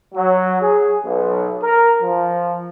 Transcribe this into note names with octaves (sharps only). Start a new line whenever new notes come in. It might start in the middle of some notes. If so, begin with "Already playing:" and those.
F#3
G#4
B1
A#4
F3